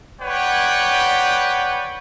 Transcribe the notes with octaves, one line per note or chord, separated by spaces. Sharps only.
B4 C#5 D5 F#5 G5